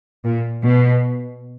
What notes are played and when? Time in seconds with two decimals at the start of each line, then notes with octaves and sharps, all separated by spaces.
0.25 A#2
0.63 B2